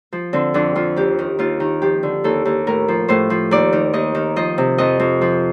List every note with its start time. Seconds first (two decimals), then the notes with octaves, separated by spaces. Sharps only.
0.13 F3
0.33 D3 C4
0.54 F2 D4
0.75 F2 F4
0.96 D#2 G4
1.19 D#3
1.39 D#2 F4
1.60 D#3
1.82 F3 G4
2.03 D3
2.24 D#2 A4
2.45 D#2
2.67 A2 A#4
2.88 F3
3.08 A2 C5
3.30 F3
3.51 D#2 D5
3.73 D#3
3.93 D#2 D#5
4.15 D#3
4.36 F3 D#5
4.58 C3
4.78 F2 D#5
5.00 F2
5.21 F3